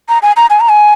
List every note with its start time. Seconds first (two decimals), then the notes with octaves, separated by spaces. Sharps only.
0.09 A#5
0.22 G#5
0.37 A#5
0.50 G#5
0.60 A#5
0.69 G#5